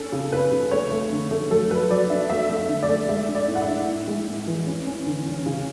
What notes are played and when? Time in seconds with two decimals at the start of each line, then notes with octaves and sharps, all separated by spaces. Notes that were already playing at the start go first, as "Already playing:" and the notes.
Already playing: C#4 A4
0.12 C#3
0.32 C#3 B4
0.52 C#3
0.71 A3 C#5
0.92 A3
1.12 D3
1.31 A3
1.50 F#3 A4
1.71 F#3 B4
1.90 F#3 D5
2.10 D4 E5
2.30 A3 E5
2.49 A3
2.57 E5
2.69 D3
2.83 D5
2.89 A3
3.08 G#3 E5
3.28 D4
3.35 D5
3.48 A2
3.55 F#5
3.62 E5
3.68 D4
3.88 A2
4.07 G#3
4.27 A2
4.47 E3
4.67 C#4
4.87 C#4
5.06 D3
5.26 C#4
5.46 C#3